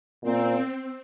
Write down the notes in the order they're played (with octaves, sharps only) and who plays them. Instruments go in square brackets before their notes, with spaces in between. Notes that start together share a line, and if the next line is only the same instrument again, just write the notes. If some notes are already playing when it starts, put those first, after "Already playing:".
[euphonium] A#2 [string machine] C4